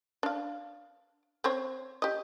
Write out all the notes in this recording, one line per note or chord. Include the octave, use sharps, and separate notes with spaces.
D4 F5
C4 C5 C#5
G4 D#5